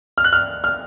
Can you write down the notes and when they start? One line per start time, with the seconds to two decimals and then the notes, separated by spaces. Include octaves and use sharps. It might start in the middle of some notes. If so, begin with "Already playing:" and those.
0.18 F6
0.24 F#6
0.33 F6
0.64 F6